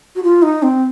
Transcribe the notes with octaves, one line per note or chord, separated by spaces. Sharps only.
F#4
F4
D#4
C4